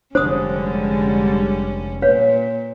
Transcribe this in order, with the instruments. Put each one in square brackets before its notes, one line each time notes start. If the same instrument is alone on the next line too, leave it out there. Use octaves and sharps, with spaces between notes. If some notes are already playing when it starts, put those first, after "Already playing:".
[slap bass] F1 D4 [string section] D3 G3 G#3 [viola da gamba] C#4 [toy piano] C5 D#6
[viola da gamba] A#2 [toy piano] B4 C#5 F5